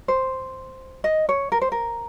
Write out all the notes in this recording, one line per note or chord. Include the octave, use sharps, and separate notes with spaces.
C5
D#5
C#5
A#4
C5
A#4